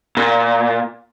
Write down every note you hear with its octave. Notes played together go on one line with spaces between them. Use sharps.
A#2